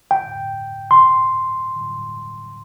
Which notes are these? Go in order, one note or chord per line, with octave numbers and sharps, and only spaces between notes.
G5
C6